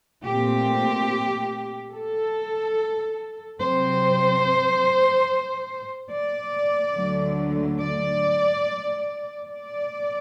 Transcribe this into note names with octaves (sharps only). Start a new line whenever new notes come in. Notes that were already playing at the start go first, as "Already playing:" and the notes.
A#2 A3 C4 G4
A4
C3 F#3 C4 C5
D5
D2 D3 F#3 A3
D5
D5